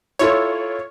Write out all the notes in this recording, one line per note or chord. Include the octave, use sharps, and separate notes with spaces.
E4 F4 A4 C#5